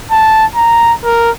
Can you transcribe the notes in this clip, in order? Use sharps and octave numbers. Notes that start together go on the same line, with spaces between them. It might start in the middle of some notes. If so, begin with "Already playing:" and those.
A5
A#5
A#4